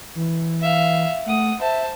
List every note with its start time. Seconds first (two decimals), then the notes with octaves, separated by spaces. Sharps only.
0.15 E3
0.61 E5 F5
1.26 A3 F#5 D#6
1.60 C5 E5 A5